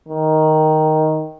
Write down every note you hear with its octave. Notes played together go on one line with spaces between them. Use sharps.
D#3